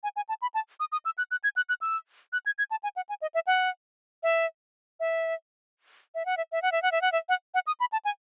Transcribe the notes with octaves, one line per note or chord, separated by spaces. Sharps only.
G#5
G#5
A5
B5
A5
D#6
D#6
E6
F#6
F#6
G#6
F#6
F#6
E6
F#6
G#6
G#6
A5
G#5
F#5
G#5
D#5
E5
F#5
E5
E5
E5
F#5
E5
E5
F#5
E5
F#5
E5
F#5
E5
F#5
F#5
D#6
B5
A5
G#5